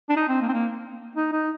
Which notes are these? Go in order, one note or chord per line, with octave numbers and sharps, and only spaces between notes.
D4
D#4
C4
A#3
C4
A#3
D#4
D#4